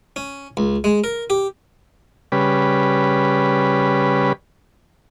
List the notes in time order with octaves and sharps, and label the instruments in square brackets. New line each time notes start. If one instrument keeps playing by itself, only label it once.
[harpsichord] C#4
C#2
G#3
A#4
G4
[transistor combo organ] C#3 G3 B4